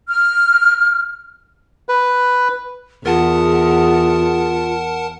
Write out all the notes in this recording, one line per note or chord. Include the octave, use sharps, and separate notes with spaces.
F6
B4
E2 F4 G#4 A#4 F#5 A5